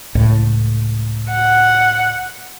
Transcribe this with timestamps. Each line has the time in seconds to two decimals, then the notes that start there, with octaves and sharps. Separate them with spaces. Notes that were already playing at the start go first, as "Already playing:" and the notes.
0.15 C#2 A2
1.32 F#5